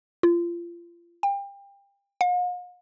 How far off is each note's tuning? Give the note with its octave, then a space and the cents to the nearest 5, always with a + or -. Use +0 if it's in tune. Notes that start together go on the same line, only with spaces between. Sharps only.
F4 -30
G5 +30
F5 +45